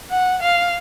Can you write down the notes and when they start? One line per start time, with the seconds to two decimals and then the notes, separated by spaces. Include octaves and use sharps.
0.10 F#5
0.42 F5